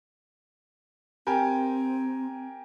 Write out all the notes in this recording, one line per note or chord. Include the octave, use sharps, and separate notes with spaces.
C4 G4 A#4 G#5